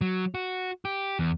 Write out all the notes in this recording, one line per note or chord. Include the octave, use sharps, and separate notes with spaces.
F#3
F#4
G4
E2